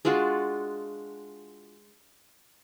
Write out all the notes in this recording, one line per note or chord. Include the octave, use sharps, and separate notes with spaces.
G#3 D4 F4 F#4